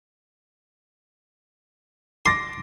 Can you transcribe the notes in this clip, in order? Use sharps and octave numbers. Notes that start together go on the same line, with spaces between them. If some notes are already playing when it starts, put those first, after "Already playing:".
C6 D6 A6 A#6